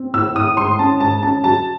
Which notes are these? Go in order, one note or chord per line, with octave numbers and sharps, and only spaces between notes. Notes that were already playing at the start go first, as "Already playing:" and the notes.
Already playing: C4
A2 E6
A2 D#6
G#2 C6
C#4 A5
G#2 A5
C#4 A5
F#3 A5